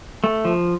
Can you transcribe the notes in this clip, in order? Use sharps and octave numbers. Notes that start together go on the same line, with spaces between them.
A3
F3